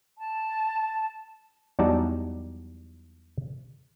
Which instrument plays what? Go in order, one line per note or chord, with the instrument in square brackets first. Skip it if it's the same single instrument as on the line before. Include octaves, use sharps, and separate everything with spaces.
[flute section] A5
[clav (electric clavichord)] E2 F#3 G3 D#4 D5 A5